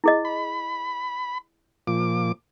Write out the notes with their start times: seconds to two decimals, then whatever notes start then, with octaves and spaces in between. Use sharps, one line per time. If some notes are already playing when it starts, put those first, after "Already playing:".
0.04 E4 G#4 D#5
0.25 B5
1.87 A#2 F3 D6